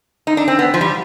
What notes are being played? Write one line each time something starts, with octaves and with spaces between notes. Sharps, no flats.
D#4
D4
C4
B3
F3
G3